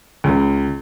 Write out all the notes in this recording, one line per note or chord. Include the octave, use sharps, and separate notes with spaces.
C#2